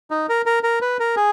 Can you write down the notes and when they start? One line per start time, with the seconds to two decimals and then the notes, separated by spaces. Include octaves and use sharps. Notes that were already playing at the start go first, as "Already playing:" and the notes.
0.11 D#4
0.29 A#4
0.46 A#4
0.63 A#4
0.82 B4
1.00 A#4
1.16 G#4